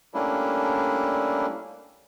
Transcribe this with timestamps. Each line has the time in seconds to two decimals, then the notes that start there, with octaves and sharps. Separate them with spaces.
0.14 G3 A3 A#3 C#4 D4 E4